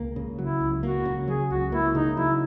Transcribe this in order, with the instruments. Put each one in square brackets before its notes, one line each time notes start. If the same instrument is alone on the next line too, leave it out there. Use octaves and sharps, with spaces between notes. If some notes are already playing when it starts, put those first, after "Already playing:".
Already playing: [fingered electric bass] C#2 A#3
C#3
[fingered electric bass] F#3 [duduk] E4
[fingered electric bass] C#2
[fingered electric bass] A#3 [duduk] F#4
[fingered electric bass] C#3
[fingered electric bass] F#3 [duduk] G#4
[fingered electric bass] C#2 [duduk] F#4
[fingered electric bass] A#3 [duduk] E4
[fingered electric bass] C#3 [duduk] D#4
[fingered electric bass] F#3 [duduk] E4